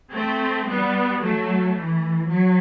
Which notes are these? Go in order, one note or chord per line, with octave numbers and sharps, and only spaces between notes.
A3 C4
G3 B3
F#3 A3
E3
F#3